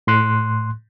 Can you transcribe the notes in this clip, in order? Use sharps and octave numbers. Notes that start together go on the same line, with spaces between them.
A2 C6 F#6